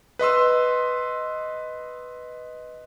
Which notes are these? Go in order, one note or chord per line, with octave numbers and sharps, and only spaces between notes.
B4 D#5 C6 E6